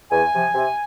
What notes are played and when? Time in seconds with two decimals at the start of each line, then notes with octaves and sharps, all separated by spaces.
0.12 E2 G#5
0.33 C3 F3
0.55 C3